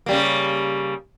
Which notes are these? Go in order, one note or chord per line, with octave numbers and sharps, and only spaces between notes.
C#3 G3 A#3